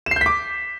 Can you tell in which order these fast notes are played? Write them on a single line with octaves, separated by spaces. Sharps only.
E7 C7 G6 B6 D6